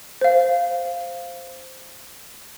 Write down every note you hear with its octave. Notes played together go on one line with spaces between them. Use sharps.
C5 F5